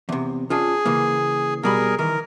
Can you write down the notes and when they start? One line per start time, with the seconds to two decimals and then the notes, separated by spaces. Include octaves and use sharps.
0.09 E2 C3
0.50 C#4 D4 F4 G#4
0.85 C#3 E3 A#3
1.63 B2 G3 G#4 A#4 B5
1.98 D#3 E3 A#4